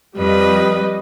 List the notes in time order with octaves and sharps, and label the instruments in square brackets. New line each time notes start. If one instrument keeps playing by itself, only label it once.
[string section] F2 [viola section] G3 D#5 [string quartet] B4